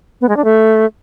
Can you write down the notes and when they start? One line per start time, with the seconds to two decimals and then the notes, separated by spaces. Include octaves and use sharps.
0.21 B3
0.29 G#3
0.37 D4
0.44 A3